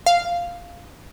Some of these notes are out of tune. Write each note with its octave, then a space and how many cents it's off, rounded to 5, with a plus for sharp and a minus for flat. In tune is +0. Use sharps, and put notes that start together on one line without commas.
F5 -5